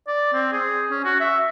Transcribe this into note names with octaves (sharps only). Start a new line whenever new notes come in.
D5
C4
G#4
C#4
F#4
E5